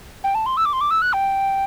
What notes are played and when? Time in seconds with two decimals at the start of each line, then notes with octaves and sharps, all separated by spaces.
0.24 G5
0.35 A5
0.46 C6
0.57 E6
0.65 D6
0.73 C6
0.81 D6
0.91 E6
1.02 F#6
1.13 G5